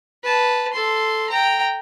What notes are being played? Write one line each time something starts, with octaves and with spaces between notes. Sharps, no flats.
B4 A5
A4 C6
G5 A#5